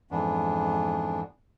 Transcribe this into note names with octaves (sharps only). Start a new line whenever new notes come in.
F2 G#2 E3 B3 D4